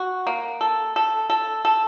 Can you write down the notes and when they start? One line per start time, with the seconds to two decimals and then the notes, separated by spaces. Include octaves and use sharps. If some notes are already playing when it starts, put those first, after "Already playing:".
Already playing: F#4
0.27 A#3
0.61 A4
0.96 A4
1.30 A4
1.65 A4